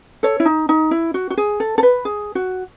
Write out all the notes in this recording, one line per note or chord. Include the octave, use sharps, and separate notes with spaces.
A4 C#5
E4
D#4
D#4
E4
F#4
F#4
G#4
A4
A4
B4
G#4
F#4